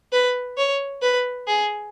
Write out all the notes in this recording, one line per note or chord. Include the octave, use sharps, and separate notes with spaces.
B4
C#5
B4
G#4